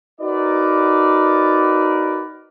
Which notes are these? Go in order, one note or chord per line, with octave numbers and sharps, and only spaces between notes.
D#4 F#4 A#4 B4 D5